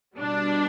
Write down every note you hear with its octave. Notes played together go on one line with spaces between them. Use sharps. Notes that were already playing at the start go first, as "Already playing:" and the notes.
B2 G3 D4